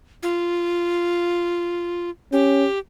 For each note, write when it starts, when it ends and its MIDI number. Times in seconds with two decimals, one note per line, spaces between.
0.23 2.10 65
2.33 2.66 61
2.33 2.79 67